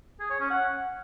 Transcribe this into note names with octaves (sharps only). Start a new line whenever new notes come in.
G#4
C#5
C#4
F#5